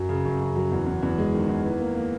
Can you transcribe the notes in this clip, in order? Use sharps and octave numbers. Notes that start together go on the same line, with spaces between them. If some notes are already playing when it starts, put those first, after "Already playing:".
Already playing: F#2 F#3
C#3
F#2
F#2
F#3
E2
E2
E2
G#3
D#3
E2
E3
A#3
A#3